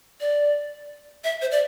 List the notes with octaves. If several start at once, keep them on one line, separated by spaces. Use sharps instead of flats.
D5
E5
C5
D5